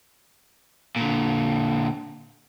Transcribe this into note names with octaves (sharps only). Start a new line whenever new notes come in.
A#2 D3